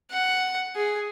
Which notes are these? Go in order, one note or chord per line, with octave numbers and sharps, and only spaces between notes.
F#5
G#4